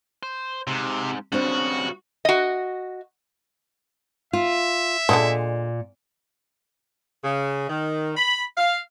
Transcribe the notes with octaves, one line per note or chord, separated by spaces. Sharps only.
C5
G#2 C3
G2 C#3 C4 D4 F#4
F#4 D#5
F4 E5
A#2 D3 F3 G#3
C#3
D#3
B5
F5